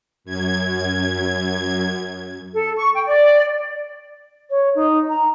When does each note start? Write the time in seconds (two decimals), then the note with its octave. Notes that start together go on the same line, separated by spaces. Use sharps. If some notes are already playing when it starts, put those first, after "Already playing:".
0.24 F#2 G#6
2.53 A4
2.77 C#6
2.94 G5
3.06 D5
4.50 C#5
4.75 D#4
5.09 A#5